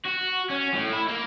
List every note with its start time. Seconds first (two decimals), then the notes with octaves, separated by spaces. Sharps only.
0.06 F#4
0.50 C#4
0.74 A2
0.92 E4
1.08 A#3